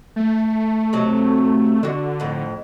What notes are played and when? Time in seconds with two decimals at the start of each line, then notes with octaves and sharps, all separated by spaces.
0.16 A3
0.93 C3 F#3
1.83 D3 D4 F#4
2.20 F2 A2